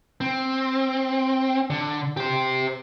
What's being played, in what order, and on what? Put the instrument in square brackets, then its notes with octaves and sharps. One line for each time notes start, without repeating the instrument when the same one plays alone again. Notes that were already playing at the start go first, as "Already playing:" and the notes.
[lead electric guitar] C4
D3
G4 C5